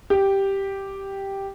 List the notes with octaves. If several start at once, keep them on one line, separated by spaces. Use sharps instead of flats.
G4